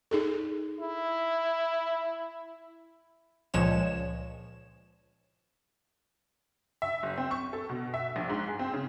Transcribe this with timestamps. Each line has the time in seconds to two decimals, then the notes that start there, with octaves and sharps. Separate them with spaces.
0.11 D#4 G#4 A4
0.81 E4
3.54 C#2 A#2 F3 G#3 C#5 E7
6.82 E5
7.03 F#1
7.18 C4
7.31 C#6
7.53 A4
7.69 B2
7.94 E5
8.16 A#1
8.30 G#2
8.48 G#4
8.59 C4
8.74 C#3